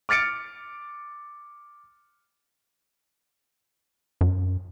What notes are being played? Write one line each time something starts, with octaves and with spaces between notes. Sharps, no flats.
D6 F6 A6 C#7 D7
F#2